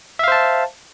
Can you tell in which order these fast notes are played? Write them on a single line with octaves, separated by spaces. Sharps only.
E5 F5 C5 A5